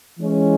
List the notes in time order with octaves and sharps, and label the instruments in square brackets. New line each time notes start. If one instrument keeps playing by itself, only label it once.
[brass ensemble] E3 G#3 C#4